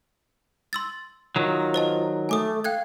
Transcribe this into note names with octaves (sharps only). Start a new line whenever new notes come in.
C6 E6 A6
D#3 F#3 F4
C5 D#5 A5
A3 G#5 D6 D#6
F5 G5 F#6 G#6